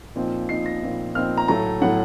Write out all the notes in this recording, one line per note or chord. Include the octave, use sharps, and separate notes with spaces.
A#2 F3 C4 D#4
A#2 F3 C4 D#4 C7
A#6
A#2 F3 C4 D#4
A#2 F3 C4 D#4 F6
A#5
A2 F#3 A3 A#5
A2 F#3 A3 F#5